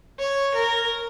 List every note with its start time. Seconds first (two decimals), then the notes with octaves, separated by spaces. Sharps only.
0.19 C#5
0.55 A#4